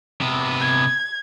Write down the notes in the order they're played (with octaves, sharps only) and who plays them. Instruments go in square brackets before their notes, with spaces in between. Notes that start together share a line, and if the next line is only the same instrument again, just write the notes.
[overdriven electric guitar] C3 B3
[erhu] G#6